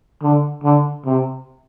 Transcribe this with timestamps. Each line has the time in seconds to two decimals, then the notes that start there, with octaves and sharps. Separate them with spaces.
0.23 D3
0.64 D3
1.05 C3